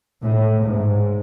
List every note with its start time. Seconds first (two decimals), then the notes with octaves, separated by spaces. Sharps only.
0.23 A2
0.65 G#2